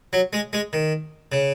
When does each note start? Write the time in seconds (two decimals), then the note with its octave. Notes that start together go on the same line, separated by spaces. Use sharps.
0.13 F#3
0.33 G#3
0.53 G#3
0.73 D#3
1.32 C#3